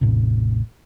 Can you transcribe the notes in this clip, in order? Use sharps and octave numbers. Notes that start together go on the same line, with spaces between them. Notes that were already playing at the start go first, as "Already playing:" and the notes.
A1 E2 A2 C3